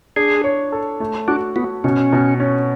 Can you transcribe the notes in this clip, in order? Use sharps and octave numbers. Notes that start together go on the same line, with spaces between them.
D4 G#4
C#5
A4
A3
D4 F#4
B3 F#4
B2 C#4
B2
C#4